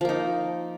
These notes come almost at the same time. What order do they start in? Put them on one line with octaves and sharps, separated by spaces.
F3 A#3 D#4